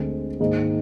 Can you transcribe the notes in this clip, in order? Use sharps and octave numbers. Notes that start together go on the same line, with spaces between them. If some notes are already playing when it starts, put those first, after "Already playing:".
Already playing: D2 D3 G#3 C4
G#2 D#3 A#3 D#4 G#4